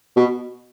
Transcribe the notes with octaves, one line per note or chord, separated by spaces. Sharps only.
B2